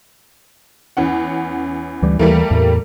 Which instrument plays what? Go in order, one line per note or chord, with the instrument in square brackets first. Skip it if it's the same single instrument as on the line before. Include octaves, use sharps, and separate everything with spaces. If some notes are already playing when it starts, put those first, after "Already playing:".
[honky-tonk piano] E2 C#4 F#5
[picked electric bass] D2 E3 G3
[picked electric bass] D#2 E3 [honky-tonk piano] G3 A3 A#3
[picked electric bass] E2 A2